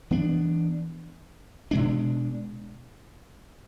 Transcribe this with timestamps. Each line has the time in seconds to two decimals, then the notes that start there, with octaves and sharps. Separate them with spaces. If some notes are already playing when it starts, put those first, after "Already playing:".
0.11 E3 B3 D4
1.71 B2 G#3 D4